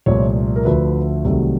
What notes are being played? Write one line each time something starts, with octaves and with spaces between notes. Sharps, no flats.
C2 A#2 F3 A3 C#5
A#4
D2 D3 F3 A3 B4
C2 C3 D#3 F#3 A3